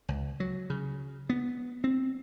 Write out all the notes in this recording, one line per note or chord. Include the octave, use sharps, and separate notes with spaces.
C#2
F#3
C#3
B3
C4